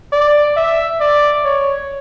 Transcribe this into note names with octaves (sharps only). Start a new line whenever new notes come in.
D5
E5
D5
C#5